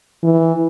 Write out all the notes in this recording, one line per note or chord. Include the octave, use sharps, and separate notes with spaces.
E3